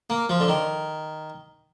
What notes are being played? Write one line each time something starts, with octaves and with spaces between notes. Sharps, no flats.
A#3
F3
D3
D#3